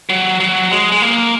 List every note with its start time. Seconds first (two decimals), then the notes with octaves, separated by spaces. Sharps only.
0.10 F#3
0.40 F#3
0.71 G#3
0.92 G#3
1.02 A#3